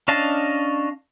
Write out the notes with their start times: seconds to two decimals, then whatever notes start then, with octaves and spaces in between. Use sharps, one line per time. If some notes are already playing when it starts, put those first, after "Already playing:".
0.08 C#4 D4 D#5 F5 A5